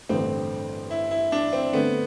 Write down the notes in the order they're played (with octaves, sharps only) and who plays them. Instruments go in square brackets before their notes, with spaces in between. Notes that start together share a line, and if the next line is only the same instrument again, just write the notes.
[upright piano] A1 G2 D3 A3 [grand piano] C4
[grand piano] E4
E4
D4
C4
[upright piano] D3 A3 C4 [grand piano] B3